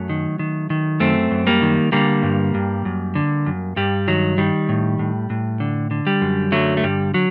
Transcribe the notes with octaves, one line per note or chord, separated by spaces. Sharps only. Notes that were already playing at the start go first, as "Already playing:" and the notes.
Already playing: F#2 F#3 A3
D#3
D#3
D#3
F#2 A3 C4
F#2
G3 A#3
D#3
D3 G3 A#3
G2
G2
F#2
D3
F#2
G2 G3
D#3 F#3
D#3 G3
A2
A2
A2
D3
D3
G3
F#2
D3 F#3 A3
A3
G2 G3
F#3